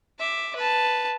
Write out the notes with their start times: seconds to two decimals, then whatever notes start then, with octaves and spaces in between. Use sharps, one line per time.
0.19 E5 D6
0.55 B4 A5